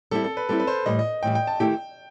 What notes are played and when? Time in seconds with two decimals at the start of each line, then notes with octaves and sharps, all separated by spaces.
0.11 G3 C4 E4 A4
0.24 A4
0.37 B4
0.49 G3 C4 E4 A4
0.60 B4
0.67 C5
0.86 A2 E3 G3 D#5
0.99 D#5
1.23 A2 E3 G3 G5
1.35 G5
1.47 A5
1.60 D#3 A3 E4 G4 G5